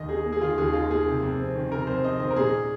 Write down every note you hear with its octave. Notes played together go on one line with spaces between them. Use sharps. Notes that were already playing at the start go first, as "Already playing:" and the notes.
Already playing: D#2 D#3 D#5
D#4 G#4
A#3
G#4
D#3 F4
D#2 G#4
D#4 F4
A#3 G#4
C3
F2
C4
D#3
C3 A#4
F2 C5
C4 D#5
D#3 C5
A#4
A#2 G#4